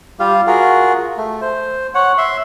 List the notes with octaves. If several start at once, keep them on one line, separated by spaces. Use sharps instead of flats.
G3 F4 G4 F5
F4 F#4 G#4 A#4
A3
C5
C#5 F#5
E5 C6